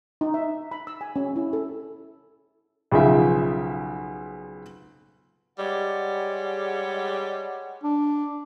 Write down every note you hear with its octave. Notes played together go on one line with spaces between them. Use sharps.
D#4
E5
B5
E6
G#5
C#4
E4
A4
B1 C#3 F3 E5
G3 G#3 C#5 F#5
D4